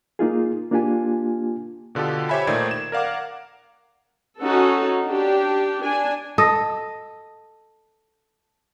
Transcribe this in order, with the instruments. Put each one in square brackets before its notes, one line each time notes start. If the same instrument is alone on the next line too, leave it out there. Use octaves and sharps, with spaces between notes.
[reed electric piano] A#3 D#4 F4 G#4
A#3 D4 F4 G4 G#5
[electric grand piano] B2 D3 F4 G4 A4
G4 C5 C#5 E5 G#5 B5
A#2 D#3 A3 C5 D5 G#6
E7
A#4 D5 F5 F#5 D6
[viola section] C#4 D#4 F#4 A4
D4 G4
D4 G#5
[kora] A4 D#5